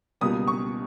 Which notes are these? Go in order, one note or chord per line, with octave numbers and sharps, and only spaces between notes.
C#2 B2 G3 A#3 D#6
C#6